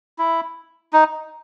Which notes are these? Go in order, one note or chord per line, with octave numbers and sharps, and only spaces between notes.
E4
D#4